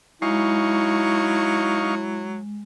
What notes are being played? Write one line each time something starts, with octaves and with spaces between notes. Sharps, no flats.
F#3 G#3 D#4 E4 F5 C#6